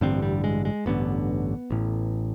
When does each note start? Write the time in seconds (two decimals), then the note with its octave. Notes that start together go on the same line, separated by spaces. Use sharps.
0.01 A1 G2 D3 C4
0.22 G3
0.44 G#3
0.65 G#3
0.86 A1 G2 D3 B3
1.71 A1 A2